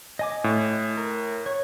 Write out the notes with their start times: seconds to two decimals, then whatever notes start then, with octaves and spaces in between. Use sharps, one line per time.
0.19 D#5 G#5 D6
0.44 A2
0.97 A#4
1.46 C#5